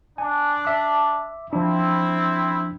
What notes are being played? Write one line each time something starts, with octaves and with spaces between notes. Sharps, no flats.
D4 G#5
E5 D6
F3 C4 D4 E4